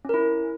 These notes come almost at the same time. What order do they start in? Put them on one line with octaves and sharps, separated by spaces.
C#4 A#4 E4